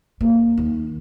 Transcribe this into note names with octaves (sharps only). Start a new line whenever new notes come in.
A#3
D#2